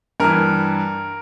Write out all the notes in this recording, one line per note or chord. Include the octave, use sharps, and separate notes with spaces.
G2 E3 A#4